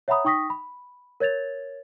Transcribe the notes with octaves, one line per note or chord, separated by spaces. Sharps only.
C#5 E5 F#5 A#5 B5 D#6
D#4 G5 C#6 D#6 A#6 B6
B5
A#4 C#5 G#6 A6 F7